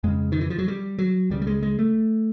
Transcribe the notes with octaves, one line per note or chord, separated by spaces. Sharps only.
F2 C#3 G#3
D#3
E3
F3
F#3
G3
F#3
C#2 C#3 G3
G3
G#3
G#3
A3